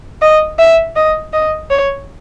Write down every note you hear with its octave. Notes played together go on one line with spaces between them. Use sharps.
D#5
E5
D#5
D#5
C#5